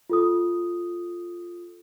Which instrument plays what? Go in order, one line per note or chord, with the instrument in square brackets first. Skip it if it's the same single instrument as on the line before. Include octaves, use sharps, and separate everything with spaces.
[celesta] F4 A4 D#6